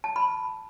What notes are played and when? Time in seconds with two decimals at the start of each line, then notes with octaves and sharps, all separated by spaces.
0.04 A5
0.16 B5